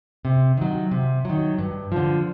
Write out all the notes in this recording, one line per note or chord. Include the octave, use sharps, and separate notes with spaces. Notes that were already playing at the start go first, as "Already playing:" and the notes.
C3
D#3 F#3
C3
D#3 F#3
G2
D3 F3